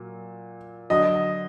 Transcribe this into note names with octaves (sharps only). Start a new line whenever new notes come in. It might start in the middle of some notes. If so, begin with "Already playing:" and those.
Already playing: A#2 F#3
D3 F#3 D#5